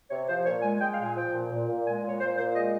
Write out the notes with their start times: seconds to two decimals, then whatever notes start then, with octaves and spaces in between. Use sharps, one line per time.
0.10 C3 C#5
0.28 F3 C5
0.45 A#2 C#5
0.62 G#3 G#5
0.80 G#3 G5
0.92 F5
0.98 A#2
1.04 G#5
1.15 F3 G5
1.33 A#2
1.50 A#2
1.67 A#2
1.85 G#3 G#5
2.02 A#2
2.08 C#5
2.20 A#2 C5
2.38 A#2 C5
2.55 G#3 D#5